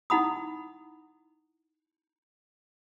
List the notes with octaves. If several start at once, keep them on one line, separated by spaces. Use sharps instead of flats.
D#4 E4 F#5 B5 D#6